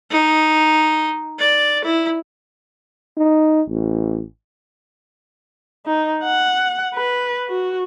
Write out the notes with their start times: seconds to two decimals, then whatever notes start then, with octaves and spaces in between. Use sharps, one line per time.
0.11 D#4
1.39 D5
1.84 E4
3.17 D#4
3.68 A1
5.86 D#4
6.24 F#5
6.95 B4
7.49 F#4